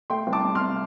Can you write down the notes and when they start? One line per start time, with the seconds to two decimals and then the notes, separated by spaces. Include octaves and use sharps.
0.10 A3 G5 C6
0.27 C2
0.32 A5 D6
0.44 C3
0.55 C6 F6
0.61 C3